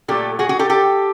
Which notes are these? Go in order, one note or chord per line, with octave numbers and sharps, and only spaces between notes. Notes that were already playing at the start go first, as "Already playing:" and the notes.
A#2 F#3 A3 G4 A4
F#4 G#4
F#4 G#4
G4 A4
G4 A4